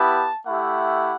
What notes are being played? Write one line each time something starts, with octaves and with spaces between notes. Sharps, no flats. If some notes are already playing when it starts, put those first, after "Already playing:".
Already playing: B3 E4 G4 A5
A3 E4 G4 F#5